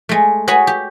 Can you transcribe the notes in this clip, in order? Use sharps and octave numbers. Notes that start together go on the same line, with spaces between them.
G#3 A3
F#4 G#4 C#5 G#5 B5
G4